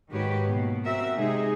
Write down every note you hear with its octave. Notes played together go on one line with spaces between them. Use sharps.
G#2 D#3 F#4 G4 B4 C#5
B2 A#3
C4 F#4 A#4 E5
C3 G#3 D#4 G#4